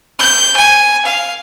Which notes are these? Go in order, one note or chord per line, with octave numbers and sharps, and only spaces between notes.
G6
G#5
F5